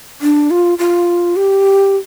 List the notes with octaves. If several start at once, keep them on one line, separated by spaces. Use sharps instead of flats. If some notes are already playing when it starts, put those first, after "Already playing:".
D4
F4
F4
G4